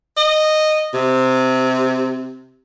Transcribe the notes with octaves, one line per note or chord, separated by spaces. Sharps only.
D#5
C3